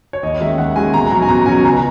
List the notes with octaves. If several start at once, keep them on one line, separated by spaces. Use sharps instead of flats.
C#5
D#2 D#5
D#3 G#3 C#4 E5
D#2 F#5
D#3 G#3 C#4 G#5
B2 A#5
F#3 C#4 A#5
G#5
B2 A#5
F#3 C#4 G#5
C#2 A#5